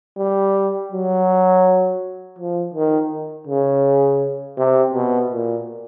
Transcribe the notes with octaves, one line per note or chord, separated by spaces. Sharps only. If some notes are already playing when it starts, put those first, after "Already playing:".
G3
F#3
F3
D#3
C#3
C3
B2
A#2